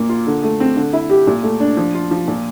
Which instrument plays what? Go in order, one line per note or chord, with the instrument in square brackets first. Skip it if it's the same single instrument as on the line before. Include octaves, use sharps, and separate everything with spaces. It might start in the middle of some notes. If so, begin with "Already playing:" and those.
Already playing: [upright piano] A#2 A#3
F4
D3
A3
C4
D3
E4
G4
A#2
A3
D4
F3
F4
F3
A#2